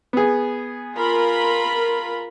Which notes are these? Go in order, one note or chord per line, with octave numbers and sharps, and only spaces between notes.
B3 G#4
F4 A#4 B5